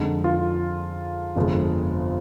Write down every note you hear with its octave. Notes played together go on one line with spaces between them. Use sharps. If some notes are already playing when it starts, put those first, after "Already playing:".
Already playing: F2 D3 G#3 D#4
F4
G1 F2 C3 F3 G#3